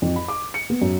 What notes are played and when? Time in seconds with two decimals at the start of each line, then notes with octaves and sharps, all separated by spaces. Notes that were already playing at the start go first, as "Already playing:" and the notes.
0.02 F2
0.16 B5
0.28 D6
0.54 C#7
0.70 B3
0.81 F#2